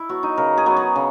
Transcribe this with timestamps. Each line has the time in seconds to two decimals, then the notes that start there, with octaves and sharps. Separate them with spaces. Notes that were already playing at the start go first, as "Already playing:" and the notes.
Already playing: E4
0.09 F#3 B3 F#4
0.23 D#4
0.37 C#3 A#4
0.57 G#4
0.66 F#3 B3
0.77 G#4
0.96 C#3